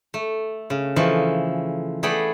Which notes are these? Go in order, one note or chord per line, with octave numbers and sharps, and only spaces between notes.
A3
C#3
E3 F3 A3 D#5
A3 B3 G#4 D5 G5 B5